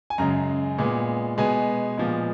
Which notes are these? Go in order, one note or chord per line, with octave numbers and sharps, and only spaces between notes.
G#5
F#2 C#3 G#3 A#5
A#2 G#3 B3
B2 G#3 B3 G#5
A#2 F3 G#3 B3